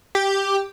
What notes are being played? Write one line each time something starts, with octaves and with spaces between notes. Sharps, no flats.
G4